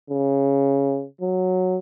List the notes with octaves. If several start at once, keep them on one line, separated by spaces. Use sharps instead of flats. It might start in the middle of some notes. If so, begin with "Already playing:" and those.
C#3
F#3